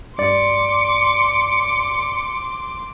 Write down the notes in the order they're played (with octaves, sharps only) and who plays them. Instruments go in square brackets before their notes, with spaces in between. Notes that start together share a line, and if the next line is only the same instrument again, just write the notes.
[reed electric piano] G2 D5 [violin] C6 D6 [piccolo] C#7